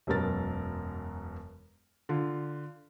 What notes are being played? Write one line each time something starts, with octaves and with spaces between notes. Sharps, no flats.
E1 F#2 B2 A#4 A6
D3 F4